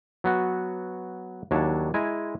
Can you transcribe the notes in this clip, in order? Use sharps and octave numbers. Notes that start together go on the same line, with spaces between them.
F#3 B3 F#4
D#2 F#3 D4 C#5 A5
G#3 E4 G#5 A#5